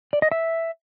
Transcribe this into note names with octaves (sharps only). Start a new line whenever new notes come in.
D5
D#5
E5